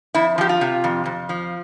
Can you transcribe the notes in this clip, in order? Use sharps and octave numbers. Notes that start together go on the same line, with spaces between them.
F2 E4
F3 G4
F4
C3
F2
F2
F3